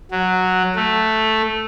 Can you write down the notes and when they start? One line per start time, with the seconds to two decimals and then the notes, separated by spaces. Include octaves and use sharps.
0.11 F#3
0.76 A3